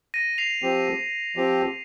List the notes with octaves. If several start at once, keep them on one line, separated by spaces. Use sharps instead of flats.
A#6 D#7
C7 F7
F3 C4 G4
F3 C4 G4